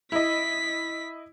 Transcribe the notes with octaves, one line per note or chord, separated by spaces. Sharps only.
E4 D#5 B6